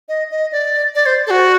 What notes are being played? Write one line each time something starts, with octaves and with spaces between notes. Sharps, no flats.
D#5
D#5
D5
D5
C5
A4
F#4